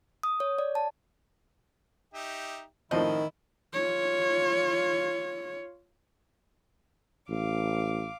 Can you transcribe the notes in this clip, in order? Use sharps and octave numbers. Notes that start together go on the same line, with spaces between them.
D#6
C#5
D5
A5
D#4 G4 E5
A2 D#3 F3 C4 E4 D#5
F4 C#5
A1 F5 D6